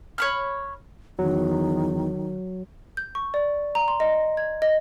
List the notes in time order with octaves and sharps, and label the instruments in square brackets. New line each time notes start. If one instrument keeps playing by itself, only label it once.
[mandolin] C#5 B5 F6
[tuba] E2 [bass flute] D#3 [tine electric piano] F#3
[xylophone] G6
C#6
D5
A#5
C6
D#5
G#6
D#5